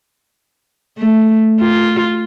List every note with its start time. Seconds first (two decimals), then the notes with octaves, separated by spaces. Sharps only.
0.98 A3
1.60 F4